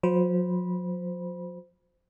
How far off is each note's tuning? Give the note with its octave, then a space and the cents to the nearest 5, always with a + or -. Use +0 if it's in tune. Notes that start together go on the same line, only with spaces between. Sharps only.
F#3 -45 C5 -15 B5 -25